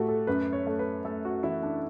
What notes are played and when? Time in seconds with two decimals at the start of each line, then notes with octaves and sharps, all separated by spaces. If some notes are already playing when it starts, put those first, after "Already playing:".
Already playing: A2 A3 F#4 G4
0.09 A4
0.27 F#2 B4
0.53 C#5
0.67 A3
0.79 B4
1.05 A3 A4
1.25 F#4
1.43 E3 E4
1.63 D4